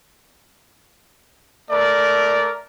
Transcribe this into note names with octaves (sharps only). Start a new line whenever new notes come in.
A3 A#4 D5